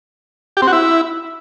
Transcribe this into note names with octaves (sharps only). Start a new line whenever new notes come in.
G4
C4
F#4
E4